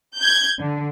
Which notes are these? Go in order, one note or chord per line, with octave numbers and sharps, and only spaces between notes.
G6 G#6
D3